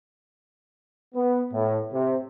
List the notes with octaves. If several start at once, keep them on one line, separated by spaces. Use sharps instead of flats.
B3
A2
C3